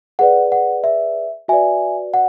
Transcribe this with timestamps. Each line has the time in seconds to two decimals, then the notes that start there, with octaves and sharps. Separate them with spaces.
0.19 G#4 B4 D5 F#5
0.52 F#5
0.84 E5
1.48 F#4 B4 D5 E5 G#5
2.14 F#5